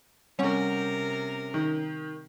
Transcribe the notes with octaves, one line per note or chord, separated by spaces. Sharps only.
C3 G3 C4 C#4 A#4 F#5
D#3